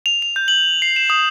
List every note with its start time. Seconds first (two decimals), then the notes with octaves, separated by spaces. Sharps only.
0.06 F7
0.22 F7
0.36 G6
0.48 F#7
0.82 C7
0.96 E7
1.10 D#6